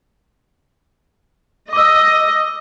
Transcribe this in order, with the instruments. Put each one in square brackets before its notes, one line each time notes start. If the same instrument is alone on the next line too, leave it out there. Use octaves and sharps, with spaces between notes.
[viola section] D#5 [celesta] D6 E6